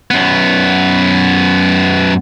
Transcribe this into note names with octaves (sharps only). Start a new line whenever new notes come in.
F#2 B3